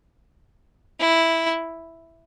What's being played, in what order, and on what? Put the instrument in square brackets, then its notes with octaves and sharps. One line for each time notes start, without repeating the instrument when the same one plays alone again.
[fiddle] E4